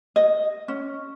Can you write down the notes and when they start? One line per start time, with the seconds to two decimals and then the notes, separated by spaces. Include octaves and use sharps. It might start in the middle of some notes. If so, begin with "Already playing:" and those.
0.16 D#5
0.68 C#4